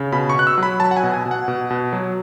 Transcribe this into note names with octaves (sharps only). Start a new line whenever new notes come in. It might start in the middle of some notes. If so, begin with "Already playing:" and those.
Already playing: C#3
B2 B5
C#6
B2 F#6
E6
F#3 B5
F#3 A5
F#5
G#5
B2
G#5
B2
F#5
B2
B2
F#3